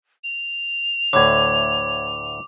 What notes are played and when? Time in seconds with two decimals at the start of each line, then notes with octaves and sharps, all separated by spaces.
0.24 F7
1.13 D2 A2 D3 C#5 D6 G#6